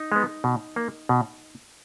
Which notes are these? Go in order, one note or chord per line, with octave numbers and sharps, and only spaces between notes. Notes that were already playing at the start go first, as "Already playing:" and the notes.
Already playing: D#4
G#3 B3
B2
A#3
B2